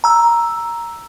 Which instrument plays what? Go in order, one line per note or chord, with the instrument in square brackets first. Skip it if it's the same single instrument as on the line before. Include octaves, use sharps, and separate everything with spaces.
[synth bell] A#5 E6